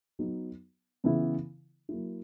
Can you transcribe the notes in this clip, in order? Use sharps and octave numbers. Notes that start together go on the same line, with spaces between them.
F#3 B3 D#4
C#3 E3 B3 E4
F#3 A#3 E4